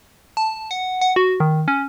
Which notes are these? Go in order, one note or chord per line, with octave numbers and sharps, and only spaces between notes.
A5
F#5
F#5
F#4
D#3
C#4